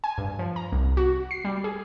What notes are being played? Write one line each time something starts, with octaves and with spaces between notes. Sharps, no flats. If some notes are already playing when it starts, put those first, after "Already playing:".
G#5
G2
F3
A#5
C2
F#4
C7
G3
G#4